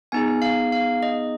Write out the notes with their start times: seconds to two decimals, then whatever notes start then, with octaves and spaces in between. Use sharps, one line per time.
0.12 B3 D#4 G#4 G#5
0.42 F5
0.72 F5
1.03 D#5